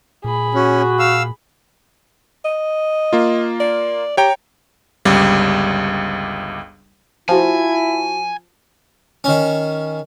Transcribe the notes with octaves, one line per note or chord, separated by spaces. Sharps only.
A#2 G#4 B5
C#4 F#4
F5 E6
D#5
A#3 F4
D5
G4 C#5 G5 A#5
G1 C#2 G3
F3 E4 F#4 G#5 A5
D#3 C#4